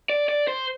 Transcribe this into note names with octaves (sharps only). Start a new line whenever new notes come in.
D5
D5
C5